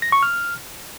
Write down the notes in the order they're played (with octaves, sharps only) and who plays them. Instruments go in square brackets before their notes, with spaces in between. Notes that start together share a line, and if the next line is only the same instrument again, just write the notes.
[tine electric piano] A#6
C#6
F6